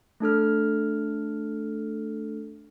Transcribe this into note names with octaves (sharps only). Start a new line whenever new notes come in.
A3 D4 A4 F6